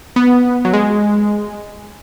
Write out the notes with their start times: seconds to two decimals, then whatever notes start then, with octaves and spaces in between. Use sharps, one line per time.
0.16 B3
0.65 F#3
0.74 G#3